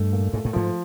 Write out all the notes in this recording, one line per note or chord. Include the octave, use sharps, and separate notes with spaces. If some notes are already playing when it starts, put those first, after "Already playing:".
Already playing: G2 A3
A#2
G#2 A3
A2
G#2 F3